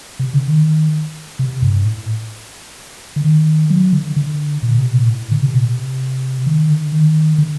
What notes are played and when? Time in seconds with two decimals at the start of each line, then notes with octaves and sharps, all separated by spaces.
0.19 C3
0.34 D3
0.47 D#3
1.39 C3
1.62 G2
1.85 A2
3.16 D3
3.24 D#3
3.70 F#3
3.93 D3
4.16 D3
4.63 A#2
4.78 C3
4.93 A#2
5.07 A2
5.31 D3
5.42 C3
5.54 A#2
5.66 C3
6.46 D#3
6.70 D3
6.92 D#3
7.38 D3